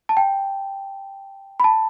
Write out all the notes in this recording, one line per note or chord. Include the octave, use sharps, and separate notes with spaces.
A5
G5
B5
A5